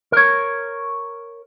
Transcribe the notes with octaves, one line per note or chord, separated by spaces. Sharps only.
A#4 C#5